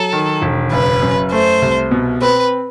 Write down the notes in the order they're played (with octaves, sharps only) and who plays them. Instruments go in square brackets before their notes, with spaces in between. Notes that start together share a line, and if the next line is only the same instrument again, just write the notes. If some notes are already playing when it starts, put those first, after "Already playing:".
Already playing: [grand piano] F#3 [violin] A4
[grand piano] D#3
E1
[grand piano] F#1 [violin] B4
[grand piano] F#2
[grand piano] A3 [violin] C5
[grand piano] C2
B2
[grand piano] C4 [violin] B4